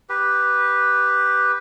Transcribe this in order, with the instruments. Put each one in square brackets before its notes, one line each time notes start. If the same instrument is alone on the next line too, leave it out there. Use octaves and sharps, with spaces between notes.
[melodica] G4 B4